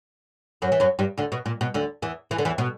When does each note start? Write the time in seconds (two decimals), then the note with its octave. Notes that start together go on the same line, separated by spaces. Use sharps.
0.62 F#2 F#3
0.72 E3
0.80 F#2 F#3
0.99 G2 G3
1.18 D2 D3
1.32 B2
1.46 A#2
1.61 B2
1.74 D2 D3
2.02 E2 E3
2.31 E3
2.38 D3
2.45 E2 E3
2.58 B2